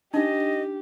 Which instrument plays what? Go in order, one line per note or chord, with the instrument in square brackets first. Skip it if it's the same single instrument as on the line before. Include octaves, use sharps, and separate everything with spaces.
[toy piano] D4 D#4 [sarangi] G4 [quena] D#5